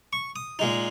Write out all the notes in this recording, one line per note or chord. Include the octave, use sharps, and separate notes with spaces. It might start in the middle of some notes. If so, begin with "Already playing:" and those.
C#6
D#6
A#2 G#3 D#4